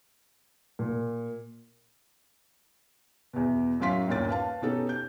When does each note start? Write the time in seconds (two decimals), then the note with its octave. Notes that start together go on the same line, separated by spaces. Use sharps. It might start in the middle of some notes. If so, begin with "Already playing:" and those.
0.79 A#2
3.33 E2 B2
3.80 F#2 A2 F#3 F5 C6 B6
4.07 G1 D#2 A#2 C#4 A6
4.29 B4 F5 A5
4.62 B2 C#4 D#4 G4 A4
4.89 G6